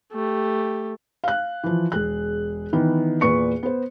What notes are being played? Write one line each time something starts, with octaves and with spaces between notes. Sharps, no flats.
A3 G4
F5 F#6
E3 F3
E1 G#4 F#6
D#3 E3 B3
E2 A#2 B4 C#6 C#7
B3 C5